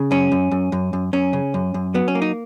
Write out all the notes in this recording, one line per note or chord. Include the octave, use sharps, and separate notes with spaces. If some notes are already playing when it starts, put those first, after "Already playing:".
Already playing: C#3
F#2 C#4
F#2
F#2
F#2
F#2
F#2 C#4
C#3
F#2
F#2
F#3 B3
C#4
A#3
D#4